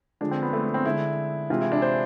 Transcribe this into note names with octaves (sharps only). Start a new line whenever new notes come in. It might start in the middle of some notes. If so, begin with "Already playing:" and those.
D3 F3 G#3 D4
C4
B3
A3
B3
C4
D3 G#3 E4
C3 E3 G#3 F4
E4
D4
C5